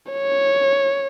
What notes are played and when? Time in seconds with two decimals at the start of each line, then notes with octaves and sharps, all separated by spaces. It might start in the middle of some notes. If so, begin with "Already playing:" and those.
0.12 C#5